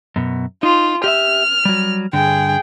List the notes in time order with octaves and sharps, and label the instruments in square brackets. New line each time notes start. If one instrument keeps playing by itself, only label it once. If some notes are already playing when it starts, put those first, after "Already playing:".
[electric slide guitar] F#2 B2
[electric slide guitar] D#4 [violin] F4
[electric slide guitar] G4 D#5 E5 [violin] F6
[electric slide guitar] F#3 G3
[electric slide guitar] G2 D3 [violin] G#4 G5